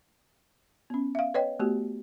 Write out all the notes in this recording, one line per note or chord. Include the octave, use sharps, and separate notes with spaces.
B3 C#4
E5 F5
B4 C#5 D#5 G5
A3 B3 F#4 G4